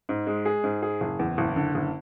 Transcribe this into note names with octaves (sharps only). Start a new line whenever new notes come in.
G#2
G#3
G#4
G#2
G#4
F#1
E2
F#1
D3
F#1